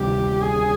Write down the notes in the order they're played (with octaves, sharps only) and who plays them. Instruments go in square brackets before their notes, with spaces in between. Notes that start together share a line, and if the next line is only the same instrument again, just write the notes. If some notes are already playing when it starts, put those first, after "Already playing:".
Already playing: [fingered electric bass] D2 C3 D#3 G3 [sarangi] G4
[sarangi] G#4